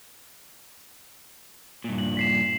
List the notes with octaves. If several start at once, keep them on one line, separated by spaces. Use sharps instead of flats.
G2 A#2
F#7
B6 C7 E7